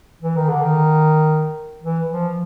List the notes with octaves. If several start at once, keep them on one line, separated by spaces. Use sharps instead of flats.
E3
D#3
D3
D#3
E3
F3